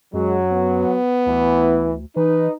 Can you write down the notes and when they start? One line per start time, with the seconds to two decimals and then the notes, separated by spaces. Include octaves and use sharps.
0.14 F#2 F#3 G#3
0.52 B3
1.27 D2 E3
2.16 E3 D#4 B4